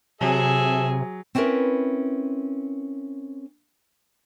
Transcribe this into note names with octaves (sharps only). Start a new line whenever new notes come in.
C3 F#3 G#4 A4 E5
C4 C#4 E4 F4 A#4 B4